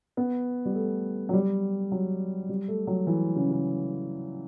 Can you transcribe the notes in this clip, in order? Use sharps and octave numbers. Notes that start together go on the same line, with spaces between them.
B3
G3
A3
F#3
G3
F#3
G3
A3
F#3
E3
C#3
C#3